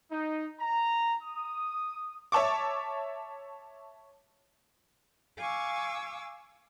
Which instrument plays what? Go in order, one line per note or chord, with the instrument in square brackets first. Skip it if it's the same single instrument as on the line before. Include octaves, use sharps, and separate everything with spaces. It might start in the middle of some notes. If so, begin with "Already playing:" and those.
[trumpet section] D#4
A#5
D#6
[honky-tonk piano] C#5 E5 A5 C#6 D6
[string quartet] F5 G#5 C#6 D6 E6